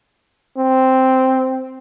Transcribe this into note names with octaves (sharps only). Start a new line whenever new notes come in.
C4